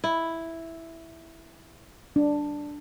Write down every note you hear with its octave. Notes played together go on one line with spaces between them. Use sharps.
E4
D4